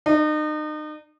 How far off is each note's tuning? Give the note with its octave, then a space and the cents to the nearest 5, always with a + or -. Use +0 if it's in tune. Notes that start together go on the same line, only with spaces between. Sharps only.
D#4 -35